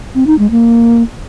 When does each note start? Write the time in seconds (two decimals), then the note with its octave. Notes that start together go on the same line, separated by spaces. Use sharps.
0.15 C4
0.27 D#4
0.39 G#3
0.51 A#3